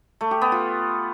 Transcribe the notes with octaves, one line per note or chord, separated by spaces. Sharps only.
A3
G4
B3
F4